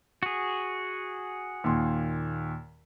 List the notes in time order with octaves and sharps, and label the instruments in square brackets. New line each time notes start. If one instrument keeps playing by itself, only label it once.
[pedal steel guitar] F#4 G#4
[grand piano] D#2 A#2 C6